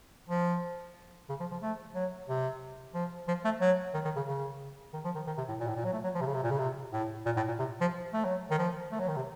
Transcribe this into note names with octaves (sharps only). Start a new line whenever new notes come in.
F3
C#3
F3
F3
A3
F#3
C3
F3
F3
A3
F#3
D#3
D#3
C#3
C#3
D#3
F3
D#3
D#3
C3
A2
A#2
A2
A#2
F#3
A3
F#3
F3
C3
C#3
C3
A#2
C#3
C3
A2
A#2
A2
A#2
C3
F3
A3
F#3
D#3
F3
A3
F#3
D#3
C3